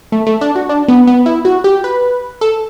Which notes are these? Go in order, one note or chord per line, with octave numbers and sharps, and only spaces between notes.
A3
A3
D4
F#4
D4
B3
B3
E4
F#4
G4
B4
A4